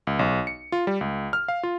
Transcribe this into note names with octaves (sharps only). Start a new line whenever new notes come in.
C#2
B1
C#7
F4
G3
C#2
F6
F5
F4